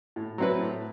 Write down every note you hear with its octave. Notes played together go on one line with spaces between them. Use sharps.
A2
F#3 C4 E4 B4
A2